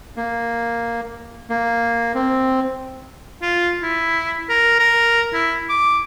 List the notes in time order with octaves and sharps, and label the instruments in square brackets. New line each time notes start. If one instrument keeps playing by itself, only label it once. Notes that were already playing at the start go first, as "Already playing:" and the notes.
[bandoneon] A#3
A#3
C4
[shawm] F4
E4
A#4
A#4
E4
D6